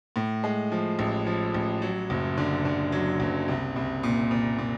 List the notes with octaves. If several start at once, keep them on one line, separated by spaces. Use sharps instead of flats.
A2
G#3
F3
A1
F3
A1
F#3
F#1
D3
D3
F#3
F#1
C2
C2
A#2
A#2
A#2